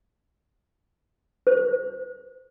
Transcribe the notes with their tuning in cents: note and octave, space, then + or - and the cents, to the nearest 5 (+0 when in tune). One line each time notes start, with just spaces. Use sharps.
C5 -15